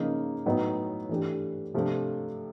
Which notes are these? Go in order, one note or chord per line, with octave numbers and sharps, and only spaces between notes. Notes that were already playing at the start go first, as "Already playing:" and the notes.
Already playing: C#3 F3 A#3 D#4
A2 F#3 B3 D#4
E3 A3 D4 G4
C3 F3 A3 D4